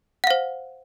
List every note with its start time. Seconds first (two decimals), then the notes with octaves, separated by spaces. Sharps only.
0.24 F#5
0.27 F5
0.30 C5